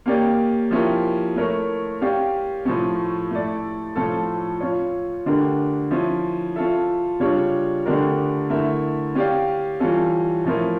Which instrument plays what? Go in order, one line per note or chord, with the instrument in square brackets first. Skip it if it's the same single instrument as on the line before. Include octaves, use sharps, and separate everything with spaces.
[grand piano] A#3 C#4 G4 A#4 D5
F3 C#4 E4 G4 A#4
A3 E4 A#4 C#5
C#4 G4 D5 F5
A2 F3 A3 C#4
A3 E4 A4 D5
A2 F3 C#4 F4 A4
C#4 F4 C#5
D3 A3 D4 G4 A#4
F3 C#4 E4
C#4 F4 A4 E5
C#3 G3 D4 F4 C#5
D3 A3 D4 G4 A#4
D3 A3 E4 A#4 E5
C#4 G4 D5 F5
E3 G3 C#4 F4 A4
A2 F3 C#4 E4 A#4